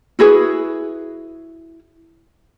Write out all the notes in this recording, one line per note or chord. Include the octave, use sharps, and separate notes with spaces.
E4 F#4 G#4 B4